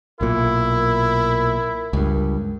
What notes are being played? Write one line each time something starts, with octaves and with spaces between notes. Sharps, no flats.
B1 A#2 E4 A#4
C#2 G2